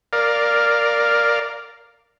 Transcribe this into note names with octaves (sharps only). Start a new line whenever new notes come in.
A#4 D5 F5